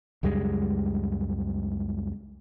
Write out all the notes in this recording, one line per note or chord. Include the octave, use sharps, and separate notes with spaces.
C#2 F#2 G3 G#3